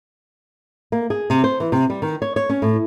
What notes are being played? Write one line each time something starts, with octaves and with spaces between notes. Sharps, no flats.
A#3
G#4
C3
C5
E3
C3
G3
D#3
C#5
C#5
C#4
A2